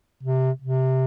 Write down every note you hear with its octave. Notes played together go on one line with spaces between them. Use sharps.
C3
C3